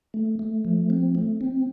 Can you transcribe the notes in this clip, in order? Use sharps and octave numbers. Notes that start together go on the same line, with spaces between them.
A3
A3
F3
C4
A3
C4